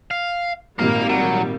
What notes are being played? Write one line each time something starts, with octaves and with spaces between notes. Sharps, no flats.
F5
G#1 A#2 G3 A#3 A#4 F5
F#3